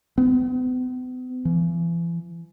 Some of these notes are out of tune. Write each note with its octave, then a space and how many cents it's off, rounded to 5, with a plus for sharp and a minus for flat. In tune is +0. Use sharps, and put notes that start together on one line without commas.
B3 +45
E3 +40